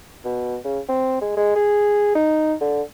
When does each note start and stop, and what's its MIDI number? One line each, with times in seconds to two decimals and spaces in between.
0.25 0.57 47
0.65 0.79 49
0.89 1.17 60
1.21 1.35 56
1.37 1.54 56
1.56 2.12 68
2.15 2.54 63
2.61 2.82 50